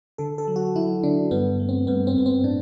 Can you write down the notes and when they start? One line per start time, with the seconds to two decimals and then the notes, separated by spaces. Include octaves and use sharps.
0.18 D3 A4
0.38 A4
0.47 F#3
0.56 F#4
0.76 F#3 E4
1.03 D3 D4
1.31 G2 B3
1.60 A3
1.69 C4
1.87 G2 B3
2.07 C4
2.16 G2 B3
2.26 C4
2.44 A2 D4